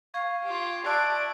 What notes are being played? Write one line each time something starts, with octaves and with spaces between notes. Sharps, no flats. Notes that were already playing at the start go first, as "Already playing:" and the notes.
F5 C#6 G#6
F4 G4
D5 E5 A5 E6 F#6 D7